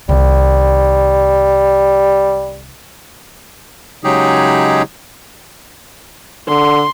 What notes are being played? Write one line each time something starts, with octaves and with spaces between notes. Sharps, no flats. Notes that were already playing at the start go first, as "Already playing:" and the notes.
C2 D#3 G3
C#3 F#3 G#3 D#4 G4 G#4
D3 C6